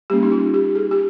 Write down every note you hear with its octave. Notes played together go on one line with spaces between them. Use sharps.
G3 A#3 C#4 G4
D#4
F4
G4
G#4
G4